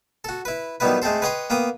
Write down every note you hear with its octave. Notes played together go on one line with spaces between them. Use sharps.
F#4 A4
E4 B4
D#3 F#3 G3 B3 E4 B4
G#3 A3 C4 A4 C5
B4 C#5 D#5 F#5 G5 C6
A#3 B3 G5 D#6